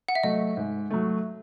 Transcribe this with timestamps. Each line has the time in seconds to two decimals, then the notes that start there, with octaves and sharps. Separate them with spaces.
0.09 F#5
0.15 E5
0.23 F#3 A3 D#5
0.57 G#2
0.91 F#3 A3